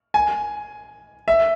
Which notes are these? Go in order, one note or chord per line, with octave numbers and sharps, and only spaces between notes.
G#5
E5